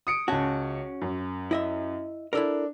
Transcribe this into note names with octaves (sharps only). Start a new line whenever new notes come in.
D#6 C#7 D7
C#2 C#4 F#4 A5
F#2
E4 D#5 E5
D4 E4 A4 A#4